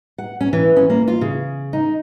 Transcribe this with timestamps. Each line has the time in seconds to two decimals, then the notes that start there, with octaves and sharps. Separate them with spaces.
0.18 F#5
0.41 C#4
0.53 E3
0.76 C#4
0.90 A#3
1.08 F4
1.21 C#3
1.73 D#4